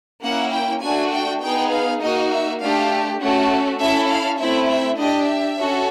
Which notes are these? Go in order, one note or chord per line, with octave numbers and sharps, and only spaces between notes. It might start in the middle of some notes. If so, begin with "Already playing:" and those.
A#3 C#4 E4 F#5
G5
A3 D4 F#4 G#5
G5
B3 D#4 G#4 G5
F5
A#3 D#4 F#4 D#5
E5
A3 D4 G4 F5
A3 C#4 F#4 A4
C#4 E4 A4 E5
F5
A3 C4 E4 E5
E5
D4 G4 D#5
E5
C#4 F#4 A4